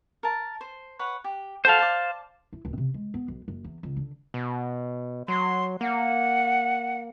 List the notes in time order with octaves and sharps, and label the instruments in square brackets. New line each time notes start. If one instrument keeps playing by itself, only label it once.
[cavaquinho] A#4 A5
C5
B4 C#5 F#5
G4
[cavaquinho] F#4 A4 A5 [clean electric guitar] C5 F5
[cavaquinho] D5 A5
[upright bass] E4
D1
C3
G#3
B3
B1
F#1
E2
C#2
D3
[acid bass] B2
[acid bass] F#3 [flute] C6
[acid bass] A#3 [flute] F#5